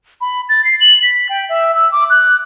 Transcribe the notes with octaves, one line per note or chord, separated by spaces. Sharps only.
B5
A6
C7
F#7
B6
G5
E5
E6
D6
F#6